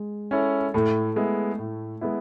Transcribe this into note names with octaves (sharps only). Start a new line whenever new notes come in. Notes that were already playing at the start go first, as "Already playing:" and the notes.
Already playing: G#3
C#4 E4 A4 C#5
A2 A3
G#3 B3 E4
A2
G#3 B3 E4